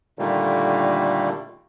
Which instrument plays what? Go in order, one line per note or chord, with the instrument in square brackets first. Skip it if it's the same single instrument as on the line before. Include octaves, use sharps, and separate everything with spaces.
[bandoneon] A#2 D3 D#3 G3 A3 A#3